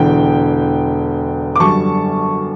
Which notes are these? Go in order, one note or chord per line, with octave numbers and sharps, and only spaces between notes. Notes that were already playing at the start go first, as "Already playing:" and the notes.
Already playing: E1 E2 D3 G5
D6
F#2 D3 G3 A5 C#6